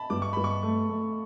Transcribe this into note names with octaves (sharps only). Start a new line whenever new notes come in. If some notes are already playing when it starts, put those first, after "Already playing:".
Already playing: A5 B5
G2 D6
C#6
G2 B5
C#6
A3
A3